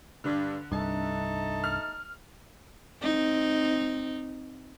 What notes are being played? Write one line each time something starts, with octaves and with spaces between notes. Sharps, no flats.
G2 D3
C2 G2 A3 D#4 A5
F6
C4 D#4